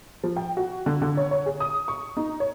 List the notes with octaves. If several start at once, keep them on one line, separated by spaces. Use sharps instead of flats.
F3
G5
F#4
D3
D3
C#5
C#5
G#4
D#6
C#6
D#4
C#5